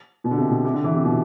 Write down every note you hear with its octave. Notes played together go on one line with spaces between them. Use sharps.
B2
D3
C3
B2
C3
D3
E3
C3
B2